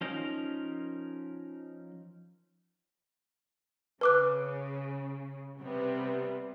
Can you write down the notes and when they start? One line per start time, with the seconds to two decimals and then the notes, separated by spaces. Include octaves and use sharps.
0.01 F3 C#4 D#4 A#4
4.01 C#3 B4 D6 F#6
5.60 C3 G3 B3